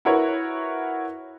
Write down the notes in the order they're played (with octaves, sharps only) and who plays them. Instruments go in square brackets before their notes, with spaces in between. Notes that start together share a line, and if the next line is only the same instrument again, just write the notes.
[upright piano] E4 F#4 A#4 B4 C#5